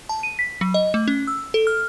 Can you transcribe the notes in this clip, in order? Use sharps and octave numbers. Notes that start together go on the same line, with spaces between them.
A5
D#7
B6
F#3
D#5
A3
C#4
E6
A4
F6